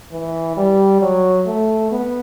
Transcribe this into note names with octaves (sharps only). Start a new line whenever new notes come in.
E3
G3
F#3
A3
B3